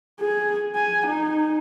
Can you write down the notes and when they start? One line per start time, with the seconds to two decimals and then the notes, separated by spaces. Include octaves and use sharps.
0.20 G#4
0.75 G#5
1.07 D#4